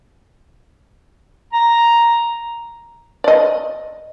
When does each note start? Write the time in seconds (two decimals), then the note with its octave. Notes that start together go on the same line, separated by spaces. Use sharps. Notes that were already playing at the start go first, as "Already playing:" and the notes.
1.53 A#5
3.24 D5 D#5